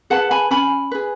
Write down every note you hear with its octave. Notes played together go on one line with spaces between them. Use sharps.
G#4 B4 F#5 A5
G#5 B5
C#4 G#5 B5
G#4 B4